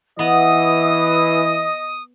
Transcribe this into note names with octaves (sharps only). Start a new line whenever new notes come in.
E3 B3 D#5 D#6